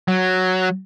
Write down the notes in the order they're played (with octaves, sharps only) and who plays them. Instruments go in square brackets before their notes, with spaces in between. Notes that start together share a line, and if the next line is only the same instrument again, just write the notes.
[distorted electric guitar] F#3